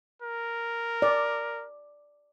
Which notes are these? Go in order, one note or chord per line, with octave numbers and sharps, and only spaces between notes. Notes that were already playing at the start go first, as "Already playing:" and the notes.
A#4
D5